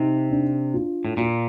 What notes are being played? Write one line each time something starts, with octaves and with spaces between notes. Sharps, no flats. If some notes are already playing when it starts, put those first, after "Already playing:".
Already playing: C3 D#4
D4
F4
A2
A#2 F4